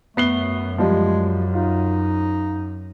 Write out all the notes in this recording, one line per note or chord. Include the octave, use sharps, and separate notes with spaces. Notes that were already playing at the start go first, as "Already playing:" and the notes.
F#2 A3 B3 C7 G7
F3 G3 G#3
D#4 F4